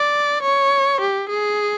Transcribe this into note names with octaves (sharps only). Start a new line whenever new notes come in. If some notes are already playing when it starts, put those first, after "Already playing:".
Already playing: D5
C#5
G4
G#4